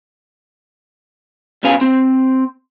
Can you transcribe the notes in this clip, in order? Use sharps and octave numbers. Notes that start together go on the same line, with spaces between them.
C#2 B2 C#4 B4 F5 G#5
C4